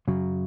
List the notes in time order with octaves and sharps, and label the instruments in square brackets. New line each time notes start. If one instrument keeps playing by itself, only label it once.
[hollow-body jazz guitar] F#2 C#3 F#3